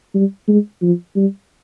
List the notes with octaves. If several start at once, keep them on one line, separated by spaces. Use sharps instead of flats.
G3
G#3
F3
G3